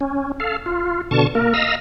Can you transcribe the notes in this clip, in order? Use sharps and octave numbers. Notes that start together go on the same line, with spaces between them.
C#4
A4 F5
F4
B2 D3 A5 C#6
A#3 A#4
D#5 F5 A#5 E6